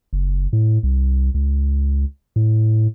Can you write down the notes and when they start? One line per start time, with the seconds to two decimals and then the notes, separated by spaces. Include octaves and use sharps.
0.13 F#1
0.53 A2
0.83 C2
1.34 C#2
2.36 A2